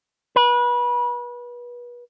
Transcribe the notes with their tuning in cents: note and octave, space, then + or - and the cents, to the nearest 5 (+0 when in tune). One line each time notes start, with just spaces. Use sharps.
B4 -30